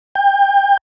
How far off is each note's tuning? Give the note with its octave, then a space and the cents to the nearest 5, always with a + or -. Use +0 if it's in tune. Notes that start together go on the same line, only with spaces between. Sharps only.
G5 +30